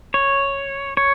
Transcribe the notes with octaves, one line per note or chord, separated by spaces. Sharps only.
C#5
C#5